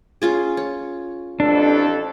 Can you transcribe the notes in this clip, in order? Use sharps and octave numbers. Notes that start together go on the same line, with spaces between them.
C#4 F4 G#4
C#5
A1 F2 D4 A4